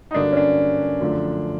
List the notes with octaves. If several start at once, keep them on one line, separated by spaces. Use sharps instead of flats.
D#4
G2 D3 F#3 A#3 D4
C#4
D4
F#2 D3 F3 A3